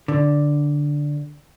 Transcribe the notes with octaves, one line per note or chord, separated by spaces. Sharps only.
D3